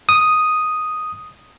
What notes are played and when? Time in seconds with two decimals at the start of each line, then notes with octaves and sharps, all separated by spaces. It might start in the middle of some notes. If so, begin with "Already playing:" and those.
0.09 D#6